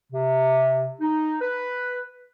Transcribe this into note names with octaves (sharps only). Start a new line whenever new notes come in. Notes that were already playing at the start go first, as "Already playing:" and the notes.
C3
D#4
B4